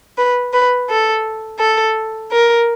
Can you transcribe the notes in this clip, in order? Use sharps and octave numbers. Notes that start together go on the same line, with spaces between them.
B4
B4
A4
A4
A#4